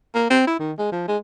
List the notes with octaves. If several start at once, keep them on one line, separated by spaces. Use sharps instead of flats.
A#3
C4
E4
D#3
G#3
F3
G#3